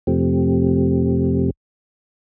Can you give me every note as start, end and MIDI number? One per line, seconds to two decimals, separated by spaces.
0.07 1.50 41
0.07 1.50 48
0.07 1.50 53
0.07 1.50 57
0.07 1.50 60
0.07 1.50 67